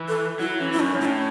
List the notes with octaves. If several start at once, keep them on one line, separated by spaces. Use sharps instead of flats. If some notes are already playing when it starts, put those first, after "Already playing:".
Already playing: E3
A4
F#3 E4
E3 C#4
E4
E2
F#2 C#4
F#2
A2 C#4 E4